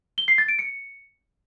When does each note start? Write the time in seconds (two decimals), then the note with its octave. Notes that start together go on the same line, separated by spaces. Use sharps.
0.18 G7
0.28 C7
0.38 A6
0.48 D7
0.59 C#7